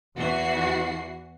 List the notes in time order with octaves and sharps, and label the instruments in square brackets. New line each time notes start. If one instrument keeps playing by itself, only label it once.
[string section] E2 E3 F#4 C7